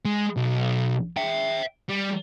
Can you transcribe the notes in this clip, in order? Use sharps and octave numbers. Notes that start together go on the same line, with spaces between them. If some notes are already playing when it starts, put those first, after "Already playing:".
G#3
B1
E5 G5
G3